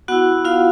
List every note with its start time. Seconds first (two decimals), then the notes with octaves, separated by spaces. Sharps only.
0.08 B3 E4 F#4 F#5
0.45 F4 F5